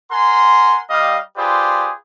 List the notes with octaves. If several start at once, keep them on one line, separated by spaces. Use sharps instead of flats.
A#4 F#5 G#5 C6
G3 D#5 F5
F4 G4 G#4 B4 C5 D5